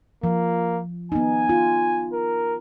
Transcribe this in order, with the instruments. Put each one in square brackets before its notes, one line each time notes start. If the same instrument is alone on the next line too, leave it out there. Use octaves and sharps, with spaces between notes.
[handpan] F3 [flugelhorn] A#3
[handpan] B3 D#4 [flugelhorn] G#5
[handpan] F4
[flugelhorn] A#4